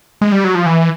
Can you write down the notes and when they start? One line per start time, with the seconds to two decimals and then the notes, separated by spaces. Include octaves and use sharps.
0.21 G#3
0.32 G3
0.44 F#3
0.55 F3
0.66 E3